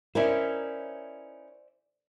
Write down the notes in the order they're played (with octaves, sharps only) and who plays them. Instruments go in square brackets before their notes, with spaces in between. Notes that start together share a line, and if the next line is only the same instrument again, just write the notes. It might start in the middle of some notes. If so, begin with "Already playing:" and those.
[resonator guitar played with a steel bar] C#4 D#4 E4 [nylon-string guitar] A#4 [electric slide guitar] C5 D5 E5